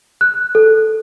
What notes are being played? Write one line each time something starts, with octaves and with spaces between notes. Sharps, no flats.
F#6
A4